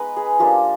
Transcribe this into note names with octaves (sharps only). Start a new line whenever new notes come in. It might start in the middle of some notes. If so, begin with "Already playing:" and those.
Already playing: G#3 B3 D#4 B4
G#4
F3 A#3 D4 G4